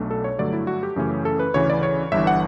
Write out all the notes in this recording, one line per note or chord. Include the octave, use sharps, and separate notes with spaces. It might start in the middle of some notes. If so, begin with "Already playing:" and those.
Already playing: B1 B2 A3 D4
A4
C#5
G2 D3 F#3 A3 D4 D5
E4
F#4
G4
F#2 C#3 E3 A3 C#4
A4
B4
D2 C#3 E3 C#5
D5
C#5
G1 G2 E3 E5
F#5